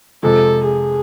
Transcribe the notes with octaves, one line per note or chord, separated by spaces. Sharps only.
F2 C3 F3 G#3 A4
G#4